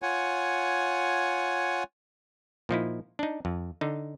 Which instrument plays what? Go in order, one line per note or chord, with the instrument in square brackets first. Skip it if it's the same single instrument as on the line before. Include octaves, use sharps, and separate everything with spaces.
[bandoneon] F4 C#5 F#5 G#5
[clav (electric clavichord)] A#2 F3 D#4 E4
D4 D#4
F2
D3 D#4